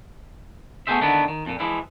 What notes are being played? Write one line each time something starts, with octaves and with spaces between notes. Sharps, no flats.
A3 B3 E4 G#4 C5 E5
D3 D#3 A3 B3 D4 E4
D#3
F2 A#2
E3 F3 G#3 E4